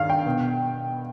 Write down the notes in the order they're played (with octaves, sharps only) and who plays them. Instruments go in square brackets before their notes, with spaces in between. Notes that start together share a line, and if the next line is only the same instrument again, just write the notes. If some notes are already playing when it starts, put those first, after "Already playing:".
Already playing: [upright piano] G2 D#3 F5
G5
B2 B3